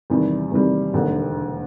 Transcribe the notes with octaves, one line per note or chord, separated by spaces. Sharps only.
E2 C3 D#3 G3
E2 C3 D#3 G3
E1 D#2 D3